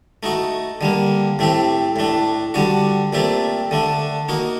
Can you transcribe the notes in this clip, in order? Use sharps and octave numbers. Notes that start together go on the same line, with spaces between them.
A3 D#4 F#4
D3 G3 A#3
A2 A3 C4 G4
A2 A3 D4
D3 G3 D4 F#4
A#2 A3 C4 G4
D3 A3 D4
A#3 D#4 F#4